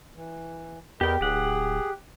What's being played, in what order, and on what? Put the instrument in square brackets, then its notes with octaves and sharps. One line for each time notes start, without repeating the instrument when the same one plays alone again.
[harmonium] E3
[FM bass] E2 [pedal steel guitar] G4 G5 [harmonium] A#4 B4 D#5
[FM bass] D1 [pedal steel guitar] G4 F#5 [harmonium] G#4